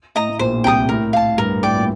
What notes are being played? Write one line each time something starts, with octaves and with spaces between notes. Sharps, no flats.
A2 D#5 A#5
A2
A#1 A#2 C5
A#2
C2 C3 G5 A#5 D#6
A2 A#4
F5 A5
G2 A#4
A2 D5 G5
A#2